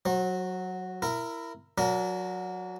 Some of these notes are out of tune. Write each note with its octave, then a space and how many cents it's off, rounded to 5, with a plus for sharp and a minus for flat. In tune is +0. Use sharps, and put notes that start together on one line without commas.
F#3 -5 C#5 -45
E4 +15 A#4 -10
F#3 -20 D4 -40 A#4 +0